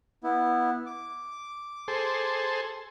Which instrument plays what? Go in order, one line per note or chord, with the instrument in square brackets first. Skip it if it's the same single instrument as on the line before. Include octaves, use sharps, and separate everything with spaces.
[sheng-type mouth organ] B3 E4
D6
[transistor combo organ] G#4 A4 C5